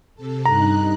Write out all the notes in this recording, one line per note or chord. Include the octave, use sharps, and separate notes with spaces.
C3 A4
G2 D#4 A#5 F#6